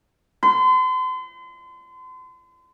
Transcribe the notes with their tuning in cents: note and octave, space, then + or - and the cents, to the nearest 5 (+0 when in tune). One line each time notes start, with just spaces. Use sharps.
C6 -40